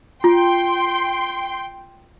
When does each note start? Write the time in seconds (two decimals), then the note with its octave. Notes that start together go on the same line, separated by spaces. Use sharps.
0.24 F4 G5 C6